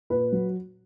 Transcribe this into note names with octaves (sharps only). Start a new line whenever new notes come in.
A#2 B4
F#3